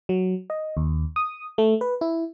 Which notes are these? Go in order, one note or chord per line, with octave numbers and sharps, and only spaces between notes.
F#3
D#5
D#2
D#6
A3
B4
E4